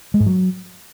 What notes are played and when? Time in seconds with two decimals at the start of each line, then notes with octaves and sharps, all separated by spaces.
0.14 G#3
0.20 G#2
0.26 F#3